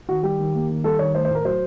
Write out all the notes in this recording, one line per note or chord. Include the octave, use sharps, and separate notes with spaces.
D#3 F#4
G3 G4
D#3
A#3
D#3
G3 A4
D#3 C#5
A3 C5
C5
A2 A#4
F#3 C5